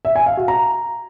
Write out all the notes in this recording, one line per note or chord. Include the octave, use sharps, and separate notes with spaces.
E5
G#5
F5
F#4
A#5